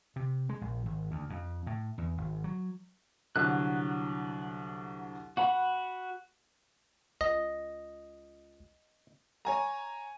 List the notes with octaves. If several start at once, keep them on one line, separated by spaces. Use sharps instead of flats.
C3
G#3
A#1
G#1
D2
F2
A2
E2
G#1
F#3
C2 D3 F#3 F#6
F#4 F#5 B5
C#2 D#5
C#5 G#5 A#5